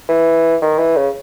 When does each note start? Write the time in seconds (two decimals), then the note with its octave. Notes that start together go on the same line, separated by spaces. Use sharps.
0.09 E3
0.62 D#3
0.79 E3
0.97 C#3